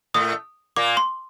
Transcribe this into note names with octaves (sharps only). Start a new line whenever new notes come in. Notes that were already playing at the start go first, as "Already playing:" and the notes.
A2 A3 D#6
A#2 A#3 D6
C6